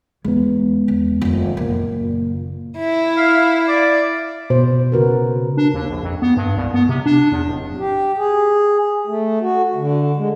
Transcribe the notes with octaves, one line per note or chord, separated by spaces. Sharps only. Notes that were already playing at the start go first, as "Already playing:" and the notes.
E2 G#3 B3
E2
F1 D#2
F#1 A#2 A#3
E4
F5
D5
B2 C5
C#3 F#4 A#4 B4
D4
D#2
A#1
F2
B3
G2
C2
B3
C3
D4
E2
D1
G4
G#4
A3
F#4
D3
G#3